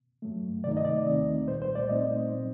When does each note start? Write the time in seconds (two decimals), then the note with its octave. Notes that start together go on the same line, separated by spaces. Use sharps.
0.22 G2 F#3 A3
0.64 C3 D#3 A3 D#4 D5
0.77 D#5
0.85 D5
1.06 D#2 D#3 A3 C4 D#4
1.48 C2 A#2 G3 C5
1.62 C5
1.75 D5
1.89 A#2 A3 C4 D#4 D#5
2.32 A#2 F#3 C4